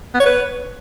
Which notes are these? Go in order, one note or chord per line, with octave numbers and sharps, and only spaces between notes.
B3
C#5
B4